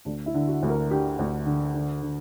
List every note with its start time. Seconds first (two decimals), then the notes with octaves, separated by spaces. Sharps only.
0.05 D2 D4
0.26 E4
0.34 D3
0.48 F#4
0.63 D2
0.69 A#4
0.91 D3 G4
1.19 D2
1.46 D3
1.74 D3
2.02 D3